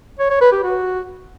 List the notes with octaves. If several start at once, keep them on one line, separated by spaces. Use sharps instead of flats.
C#5
C#5
B4
G4
F#4